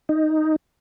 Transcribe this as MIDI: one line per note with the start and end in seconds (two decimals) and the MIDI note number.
0.09 0.56 63